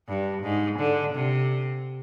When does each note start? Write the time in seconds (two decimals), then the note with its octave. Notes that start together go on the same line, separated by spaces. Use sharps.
0.08 G2
0.43 G#2
0.79 D3
1.14 C3